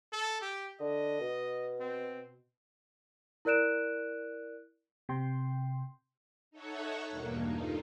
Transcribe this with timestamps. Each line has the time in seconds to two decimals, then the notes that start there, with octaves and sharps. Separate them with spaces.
0.13 A4
0.42 G4
0.80 D3 D#5
1.20 B2
1.80 C4
3.45 E4 A#4 D5 F#6 D7 E7
5.09 C3 G5 C6
6.51 D#4 A4 C#5 E5 F#5 C#6
7.10 E2 G2 B2 A#3
7.44 G2 A3 D#4 F4